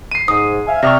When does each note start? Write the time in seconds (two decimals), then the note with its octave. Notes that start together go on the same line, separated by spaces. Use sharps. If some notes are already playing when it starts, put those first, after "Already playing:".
0.11 C7 D#7
0.28 G#2 D#6
0.67 E5 F5 G#5
0.83 C3 D5 E5 C#6 D#6 F6 A#6